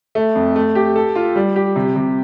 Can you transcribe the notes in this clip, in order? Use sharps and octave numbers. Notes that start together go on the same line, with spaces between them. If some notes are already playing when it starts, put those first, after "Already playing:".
A3
F2
A3
G4
A4
F4
G3
G4
C3
C3